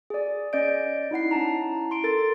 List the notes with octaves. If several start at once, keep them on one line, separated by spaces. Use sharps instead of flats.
G#4 D5
C#4 D5 D#5 G6 D7
D#4 E4 F#5 C7
C#4 E4 A5 A#5
C6 D7
A4 A#4 A6